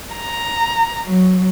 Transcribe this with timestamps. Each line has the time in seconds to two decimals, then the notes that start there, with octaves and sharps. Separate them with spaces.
0.15 A#5
1.07 F#3